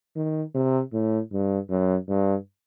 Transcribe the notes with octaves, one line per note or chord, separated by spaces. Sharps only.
D#3
C3
A2
G2
F#2
G2